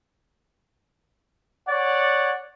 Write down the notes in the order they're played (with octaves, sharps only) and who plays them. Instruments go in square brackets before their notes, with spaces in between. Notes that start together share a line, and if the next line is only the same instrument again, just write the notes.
[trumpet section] C#5 D5 F#5